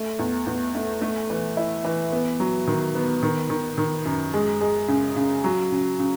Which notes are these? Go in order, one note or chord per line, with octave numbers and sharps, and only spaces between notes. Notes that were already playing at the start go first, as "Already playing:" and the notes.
Already playing: A3
E2
E2
A3
A3
E3
E4
E3
B3
F#3
D#3
B3
D#3
D#3
D#3
F#2
G#3
G#3
C#3
C#3
F#3
C#3
C#3